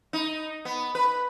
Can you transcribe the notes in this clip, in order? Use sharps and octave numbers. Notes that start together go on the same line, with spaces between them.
D#4
B3
B4